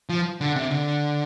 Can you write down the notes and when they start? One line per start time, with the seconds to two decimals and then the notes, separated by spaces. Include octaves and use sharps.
0.09 F3
0.41 D3
0.56 C3
0.71 D3